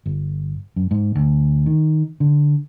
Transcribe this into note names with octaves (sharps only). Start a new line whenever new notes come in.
G1
F#2
G#2
D2
D#3
D3